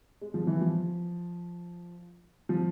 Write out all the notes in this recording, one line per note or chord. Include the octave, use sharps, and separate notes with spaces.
G#3
F3
E3
F3
F3